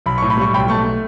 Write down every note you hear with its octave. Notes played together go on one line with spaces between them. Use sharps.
B1 B5
A2 C#6
B5
G3 C#6
B1 G5 B5
A3 A5 C#6
A3